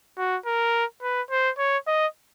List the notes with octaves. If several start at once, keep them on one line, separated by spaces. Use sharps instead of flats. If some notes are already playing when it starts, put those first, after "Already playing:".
F#4
A#4
B4
C5
C#5
D#5